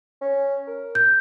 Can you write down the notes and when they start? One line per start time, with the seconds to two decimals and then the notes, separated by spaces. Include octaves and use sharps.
0.22 C#4
0.67 A#4
0.95 G6